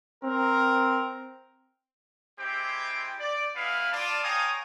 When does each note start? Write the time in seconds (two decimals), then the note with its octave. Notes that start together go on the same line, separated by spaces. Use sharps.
0.24 C4 A#4
2.39 G#3 C4 E4 G4 C5 G5
3.20 D5
3.56 G#3 B3 E4 F5
3.92 F4 D5 A5
4.24 C#5 F5 G5 G#5 A#5 D#6